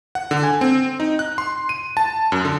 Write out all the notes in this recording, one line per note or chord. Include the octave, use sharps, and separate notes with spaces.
F#5
D3
G#5
C4
D#4
F#6
C6
D#7
A5
F#2
D3